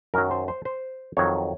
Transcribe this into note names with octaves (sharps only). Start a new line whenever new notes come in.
F#2 D#3 F#3 A#4
C5
C5
C5
F2 D#3 F#3 C#5